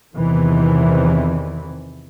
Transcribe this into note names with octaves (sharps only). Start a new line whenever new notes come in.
E2 C3 D#3 E3